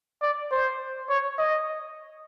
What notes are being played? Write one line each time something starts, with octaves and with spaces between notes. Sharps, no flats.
D5
C5
C#5
D#5